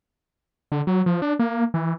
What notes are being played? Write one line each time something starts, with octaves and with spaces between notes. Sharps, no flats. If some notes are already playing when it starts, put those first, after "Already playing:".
D3
F#3
F3
D4
A#3
E3